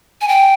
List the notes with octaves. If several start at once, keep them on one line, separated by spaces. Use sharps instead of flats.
G#5
G5